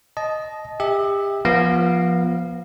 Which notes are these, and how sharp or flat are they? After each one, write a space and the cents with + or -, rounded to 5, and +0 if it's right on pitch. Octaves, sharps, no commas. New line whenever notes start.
D#5 +0 A5 -25
G4 +30 E5 -20
F3 +0 B3 -35 F5 -10